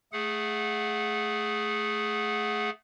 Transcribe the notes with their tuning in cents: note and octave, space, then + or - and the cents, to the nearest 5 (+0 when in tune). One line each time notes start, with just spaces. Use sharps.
A3 -10 G#4 +0 F#5 -20